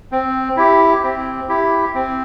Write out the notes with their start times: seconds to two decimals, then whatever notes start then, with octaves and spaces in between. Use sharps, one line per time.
0.12 C4
0.57 E4 G4
1.03 C4
1.49 E4 G4
1.94 C4